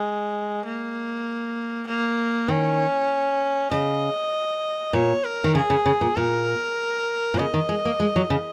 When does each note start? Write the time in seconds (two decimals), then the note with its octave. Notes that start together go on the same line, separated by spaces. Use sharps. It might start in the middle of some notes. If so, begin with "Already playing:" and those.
Already playing: G#3
0.65 A#3
1.87 A#3
2.48 D#3 C#4
3.71 C#3 D#5
4.93 A#2 C#5
5.24 A#4
5.44 D#3
5.55 C#3 G#4
5.70 C#3
5.86 C#3
6.01 A#2
6.16 A#2 A#4
7.34 A#2
7.38 C#3 D#5
7.54 D#3
7.69 G#3
7.85 A#3
8.00 G#3
8.16 F#3
8.30 C#3